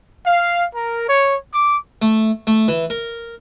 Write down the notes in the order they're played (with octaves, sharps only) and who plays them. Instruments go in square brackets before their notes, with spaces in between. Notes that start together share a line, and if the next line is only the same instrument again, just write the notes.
[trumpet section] F5
A#4
C#5
D6
[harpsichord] A3
A3
E3
A#4